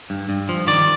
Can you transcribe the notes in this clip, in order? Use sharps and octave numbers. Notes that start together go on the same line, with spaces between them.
G2
G2
F3
D#3 D5